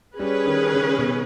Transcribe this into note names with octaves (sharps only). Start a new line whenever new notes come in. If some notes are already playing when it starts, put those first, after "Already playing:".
G3 C#4 G#4 B4
D#3
C#3
B2